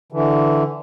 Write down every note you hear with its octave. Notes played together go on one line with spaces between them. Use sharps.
D3 E3